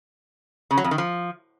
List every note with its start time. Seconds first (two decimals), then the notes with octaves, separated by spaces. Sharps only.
0.71 C#3
0.78 F#3
0.84 F2
0.91 D#3
0.98 F3